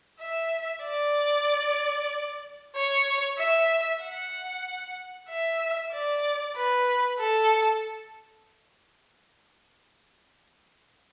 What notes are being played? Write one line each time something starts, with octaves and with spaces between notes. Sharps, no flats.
E5
D5
C#5
E5
F#5
E5
D5
B4
A4